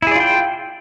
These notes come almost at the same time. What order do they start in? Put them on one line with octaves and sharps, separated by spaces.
E4 G#4 D5 F4 G5